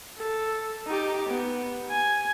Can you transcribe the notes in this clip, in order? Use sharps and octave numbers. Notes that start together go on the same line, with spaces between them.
A4
D#4 G4
B3
G#5